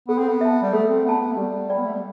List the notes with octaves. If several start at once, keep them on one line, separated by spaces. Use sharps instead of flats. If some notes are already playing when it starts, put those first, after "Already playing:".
B3 A4
C4
B3
E5 A5
G3
A3 A4
C4
B3 E5 A5
B3
A3
G3 G4
D5 G5 B5
B3
A3
G3